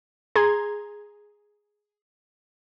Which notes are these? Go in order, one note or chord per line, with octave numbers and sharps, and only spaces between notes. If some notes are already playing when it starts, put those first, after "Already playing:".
G#4 A#5 C6 G#6